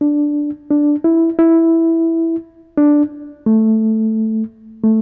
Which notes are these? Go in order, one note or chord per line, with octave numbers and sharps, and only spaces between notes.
D4
D4
E4
E4
D4
A3
A3